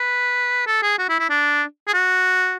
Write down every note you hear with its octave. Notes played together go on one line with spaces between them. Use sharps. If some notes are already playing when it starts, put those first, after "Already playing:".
Already playing: B4
A4
G#4
F#4
E4
E4
D4
G#4
F#4